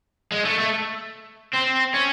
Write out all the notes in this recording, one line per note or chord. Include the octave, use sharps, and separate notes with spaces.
G#3
A3
A3
C4
C#4